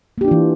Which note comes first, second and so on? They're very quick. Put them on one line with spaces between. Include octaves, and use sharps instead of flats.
A#3 G4 D4 F4 E3